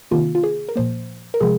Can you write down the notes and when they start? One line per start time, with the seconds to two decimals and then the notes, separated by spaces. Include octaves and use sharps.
0.11 C3 D#3 A#3 F4
0.35 F4
0.44 G#4
0.69 A#4
0.76 A#2 F3 A#3 C5
1.34 A#4
1.40 C3 F3 G#3 G#4